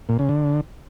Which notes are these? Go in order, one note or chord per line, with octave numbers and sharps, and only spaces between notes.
A#2
C#3
D3